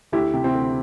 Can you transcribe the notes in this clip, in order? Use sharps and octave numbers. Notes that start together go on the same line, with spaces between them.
D2 E4 G4
C3
C4 E4
D2